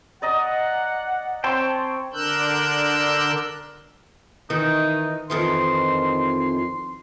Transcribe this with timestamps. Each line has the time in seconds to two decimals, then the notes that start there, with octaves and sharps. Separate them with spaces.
0.22 D5 D#5 F#5 A#5
1.44 C4 C#5 G5 A5 C6
2.14 D3 D4 A#4 E6 F#6 G6
4.50 D#3 E3 D#4
5.30 F2 D#3 E3 C6